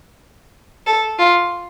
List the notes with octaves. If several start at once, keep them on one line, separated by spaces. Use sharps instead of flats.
A4
F4